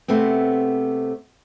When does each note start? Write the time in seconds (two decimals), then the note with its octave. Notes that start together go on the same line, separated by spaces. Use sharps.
0.08 C3 A3 B3 C4